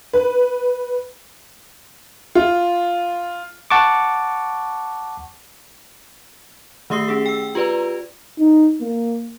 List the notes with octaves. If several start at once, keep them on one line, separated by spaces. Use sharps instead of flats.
B4
F4
F#5 A5 C#6 D6
D#3 A3 G4 E5 D#6 C7
C#4 G#4
G5 E6
F4 G4 B4 D5 A#5
D#4
A#3